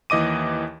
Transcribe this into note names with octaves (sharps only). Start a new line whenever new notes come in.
D#2 E3 D#5 D6 D#7